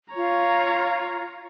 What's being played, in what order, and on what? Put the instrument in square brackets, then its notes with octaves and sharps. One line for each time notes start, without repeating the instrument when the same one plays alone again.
[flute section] F4 [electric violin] C#5 A#5